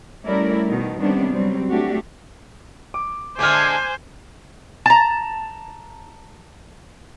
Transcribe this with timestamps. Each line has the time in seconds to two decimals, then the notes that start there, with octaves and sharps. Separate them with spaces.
0.23 G3 A3 C#4 E4 A#4 D5
0.67 B2 D#3
0.99 C3 D#3 G3 B3 C#4 D4
1.31 F#3 G3 C4
1.69 A3 D4 F#4 G4
2.94 D6
3.39 D3 G#3 A3 C5 G#5 D6 F6
4.86 A5 A#5